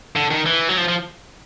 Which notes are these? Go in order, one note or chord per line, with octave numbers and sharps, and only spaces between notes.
D3
D#3
E3
F#3
F3
F3